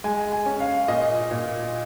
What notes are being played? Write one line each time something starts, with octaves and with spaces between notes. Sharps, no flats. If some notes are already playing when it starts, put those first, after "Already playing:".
G#3 G#5
G#5
C#4
F5
A#2 D#5
A#2